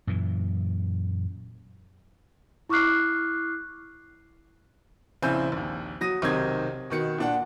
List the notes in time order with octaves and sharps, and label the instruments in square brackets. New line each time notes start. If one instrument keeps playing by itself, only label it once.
[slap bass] F#2 A#2 E3
[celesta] E4 C#6 D6 F6 F#6 C7
[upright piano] A#1 C#3 C4 E4 G#5 G6
A#1 D#2
F#3 D#6 A#6 D#7
B1 C3 D#3 C4 C6 G#6
B2 D#3 C#7
A#2 D4 F#5